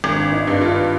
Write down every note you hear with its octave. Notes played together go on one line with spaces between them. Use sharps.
G#1 D4
C4
D4
D#4
G2
F4